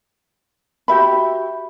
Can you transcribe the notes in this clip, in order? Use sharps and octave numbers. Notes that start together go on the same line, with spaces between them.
F#4 G4 E5 B5